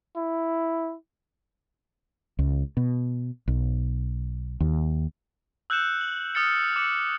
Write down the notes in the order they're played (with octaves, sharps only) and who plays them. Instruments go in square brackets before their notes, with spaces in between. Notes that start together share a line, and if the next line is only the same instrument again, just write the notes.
[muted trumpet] E4
[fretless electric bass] C#2
B2
B1
D#2
[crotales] E6 F#6 G6 C#7 E7
F#7
D#6 F6 A6 C#7
D6 E6 C#7